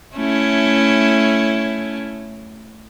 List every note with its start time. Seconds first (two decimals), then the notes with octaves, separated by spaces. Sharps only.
0.16 A3 C#4 E4